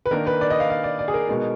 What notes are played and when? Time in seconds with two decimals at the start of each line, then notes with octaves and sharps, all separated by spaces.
0.06 B4
0.11 D#3 A#3 D4 A#4
0.27 B4
0.41 D5
0.50 D#5
0.60 F5
0.70 F5
0.84 D5
0.99 D5
1.08 G#4
1.14 A#4
1.28 B2 G#3 B3 D#4